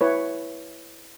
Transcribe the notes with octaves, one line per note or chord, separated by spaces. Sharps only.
E4 B4 C#5